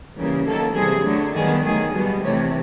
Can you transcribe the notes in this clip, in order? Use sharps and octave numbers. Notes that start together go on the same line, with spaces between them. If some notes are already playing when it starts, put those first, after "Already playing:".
C#3 E3 G3 A#3
D#3 F#3 A#3 A4
C3 E3 G3 G#4
D3 F#3 A3
D#3 G3 B3 G#4
D#3 F#3 A3 G#4
B2 G3 B3
C3 E3 A3 C#5